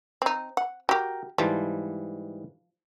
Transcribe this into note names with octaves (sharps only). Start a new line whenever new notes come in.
C4 D#4
F#5
F#4 G4 A#4 G5
G#2 E3 F3 G3